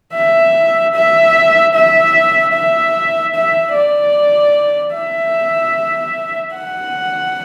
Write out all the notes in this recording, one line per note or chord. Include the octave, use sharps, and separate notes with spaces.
E5
E5
E5
E5
E5
D5
E5
F#5